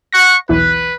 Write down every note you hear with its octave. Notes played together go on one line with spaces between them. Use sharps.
F#5 C#6 A#6
B1 E2 E3 B4